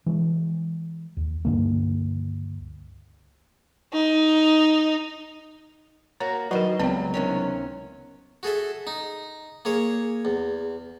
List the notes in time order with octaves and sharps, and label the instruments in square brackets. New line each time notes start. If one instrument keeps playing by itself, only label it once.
[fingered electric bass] E3 G#3
D#2
C#2 G2 D3 A#3
[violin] D#4
[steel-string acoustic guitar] A#3 F#4 A#4 [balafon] C#5 [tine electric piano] A#5
[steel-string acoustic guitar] D#3 D#5 [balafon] F#3 A#4 [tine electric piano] F#4 B4
[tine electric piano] C#2 B3 [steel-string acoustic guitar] C#3 G3 [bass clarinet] F#3 [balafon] C4 G5
[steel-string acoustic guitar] C3 D#3 C#4
[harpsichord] F#4 G#4 A4 E5
D#4
A#3 G#4 C#5
E2